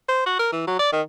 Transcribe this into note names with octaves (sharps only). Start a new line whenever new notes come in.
C5
F#4
A#4
E3
F#3
D5
D#3